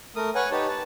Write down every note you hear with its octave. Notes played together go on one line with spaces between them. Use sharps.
A3 A#4 D#6
B4 C#5 F#5 G#5 C#6
D#4 G4 B4 C#5 A5
B4 A5